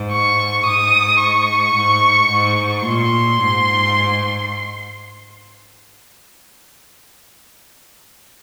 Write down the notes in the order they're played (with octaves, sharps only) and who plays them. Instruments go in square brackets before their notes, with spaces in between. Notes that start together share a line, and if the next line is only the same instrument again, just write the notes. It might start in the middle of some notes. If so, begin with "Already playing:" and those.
Already playing: [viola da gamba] G#2
[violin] C#6
[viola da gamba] G#2 [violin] D#6
[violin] C#6
[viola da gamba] G#2
G#2
[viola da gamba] A#2 [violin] C6
[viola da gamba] G#2